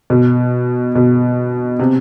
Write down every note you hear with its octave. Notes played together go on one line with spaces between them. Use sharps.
B2
B2
C3